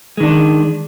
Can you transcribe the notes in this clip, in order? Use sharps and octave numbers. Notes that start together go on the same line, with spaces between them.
D#3 G#3 D4